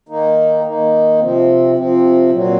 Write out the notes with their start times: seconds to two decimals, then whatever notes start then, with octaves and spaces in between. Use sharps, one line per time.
0.09 D#3 A#3 D#4
0.64 D#3 A#3 D#4
1.20 C3 F3 C4
1.76 C3 F3 C4
2.30 A#2 F#3 C4